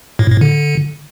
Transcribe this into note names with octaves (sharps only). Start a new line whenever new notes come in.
A2
A2
D3